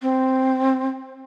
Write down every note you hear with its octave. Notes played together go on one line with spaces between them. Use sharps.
C4